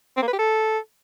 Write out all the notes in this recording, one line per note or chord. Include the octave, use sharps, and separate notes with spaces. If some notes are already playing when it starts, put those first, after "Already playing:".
C4
A#3
B4
G4
A4